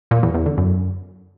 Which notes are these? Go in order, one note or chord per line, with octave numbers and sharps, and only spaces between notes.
A#2
E2
E2
D3
F#2